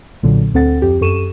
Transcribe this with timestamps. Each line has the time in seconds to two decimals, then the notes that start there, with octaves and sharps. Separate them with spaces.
0.23 B1 A#2 D3 F#3
0.54 D2 C4 A4 F#5 A6
0.82 F2 G4
1.01 F#2 G4 A4 C#6 D#7 E7